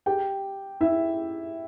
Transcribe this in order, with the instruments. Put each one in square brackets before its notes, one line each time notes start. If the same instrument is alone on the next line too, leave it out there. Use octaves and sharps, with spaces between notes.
[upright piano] G4 G5
E4 E5